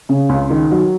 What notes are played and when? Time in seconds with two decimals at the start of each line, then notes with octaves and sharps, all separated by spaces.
0.09 C#3
0.29 C#2
0.50 D#3
0.71 F#3